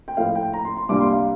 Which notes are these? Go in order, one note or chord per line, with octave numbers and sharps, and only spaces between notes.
G5
A2 F3 A3 F5
G5
A#5
C6
C6
C2 A#2 G3 A#3 D4 D6
C6
F5